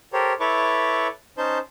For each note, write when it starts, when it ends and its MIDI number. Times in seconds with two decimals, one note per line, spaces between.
0.13 0.33 67
0.13 0.33 69
0.13 0.33 70
0.13 0.33 72
0.13 0.33 73
0.40 1.07 64
0.40 1.07 69
0.40 1.07 71
0.40 1.07 73
0.40 1.07 85
0.40 1.07 86
1.38 1.58 61
1.38 1.58 63
1.38 1.58 72
1.38 1.58 81
1.38 1.58 91